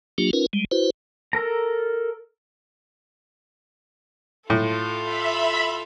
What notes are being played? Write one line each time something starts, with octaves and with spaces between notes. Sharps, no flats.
F#3 A#3 D4 F4 G4
C#4 D#4 F4 A#4 B4
G3 G#3
E4 F#4 B4 C5
A4 A#4 A#5
A2 F4 A4
E5 B5